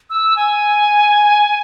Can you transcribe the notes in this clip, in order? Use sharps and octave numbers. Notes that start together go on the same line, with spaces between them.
E6
G#5